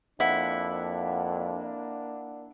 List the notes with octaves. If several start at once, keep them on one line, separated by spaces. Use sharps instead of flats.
F2 A#3 D4 E4 F#5